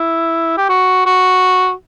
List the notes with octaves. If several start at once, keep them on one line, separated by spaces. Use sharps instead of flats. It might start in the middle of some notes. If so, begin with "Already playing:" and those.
Already playing: E4
G4
F#4
F#4